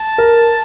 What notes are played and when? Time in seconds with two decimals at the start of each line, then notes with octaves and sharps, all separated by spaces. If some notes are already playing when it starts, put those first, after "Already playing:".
Already playing: A5
0.18 A#4